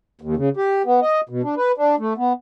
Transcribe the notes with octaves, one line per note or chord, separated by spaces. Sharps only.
D#2
C#3
G4
B3
D#5
B2
D4
B4
D4
A3
B3